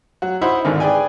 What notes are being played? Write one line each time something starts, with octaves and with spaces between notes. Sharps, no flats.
F#3 F#4
D#4 E4 C5 E5 F#5 B5
G#1 G#2 D3 D#3
G#4 B4 D5 G5 G#5